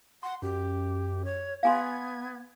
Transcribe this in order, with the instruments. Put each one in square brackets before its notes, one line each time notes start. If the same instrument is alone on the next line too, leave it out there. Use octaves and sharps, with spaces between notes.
[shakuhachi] F#5 [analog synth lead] C6
[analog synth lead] F#2 [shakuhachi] G4
[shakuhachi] C#5
[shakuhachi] B3 [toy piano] F5 G#5 C6 [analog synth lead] G#6